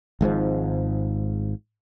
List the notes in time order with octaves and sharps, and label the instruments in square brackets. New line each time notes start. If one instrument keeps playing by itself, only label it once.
[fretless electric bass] G#1 G#2 D#3 F3